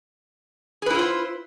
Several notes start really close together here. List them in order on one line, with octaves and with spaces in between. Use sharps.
G#4 B4 E4 F4 C5